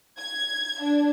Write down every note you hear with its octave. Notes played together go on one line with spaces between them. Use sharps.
G#6
D4